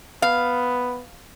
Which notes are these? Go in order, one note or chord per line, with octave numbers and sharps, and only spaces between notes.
B3 F5